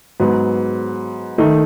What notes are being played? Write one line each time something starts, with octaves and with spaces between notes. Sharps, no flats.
G#2 F#3 B3
D#3 A3 D#4